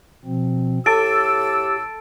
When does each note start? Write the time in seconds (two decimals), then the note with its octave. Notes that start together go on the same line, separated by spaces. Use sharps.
0.25 B2 F3 C4
0.86 A2 G4 A4 D6 E6 A6 D7